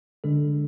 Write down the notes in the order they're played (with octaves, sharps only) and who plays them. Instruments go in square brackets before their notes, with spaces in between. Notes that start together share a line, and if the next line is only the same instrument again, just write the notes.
[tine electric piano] D3 G#3 D4 A4